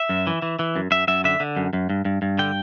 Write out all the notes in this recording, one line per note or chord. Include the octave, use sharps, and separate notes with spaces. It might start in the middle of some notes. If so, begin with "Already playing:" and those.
Already playing: E5
F#2
E3
E3
E3
F#2
F#2 E5
F#2 E5
D3 E5
D3
F#2
F#2
G2
G2
G2
D3 G5